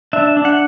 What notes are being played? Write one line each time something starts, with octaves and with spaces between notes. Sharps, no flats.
D4 E5
D4
F#5